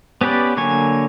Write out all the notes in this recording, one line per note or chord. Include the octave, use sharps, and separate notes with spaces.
B3 C#4 G4 B4 D5
D3 F#3 A#3 C#5 G#5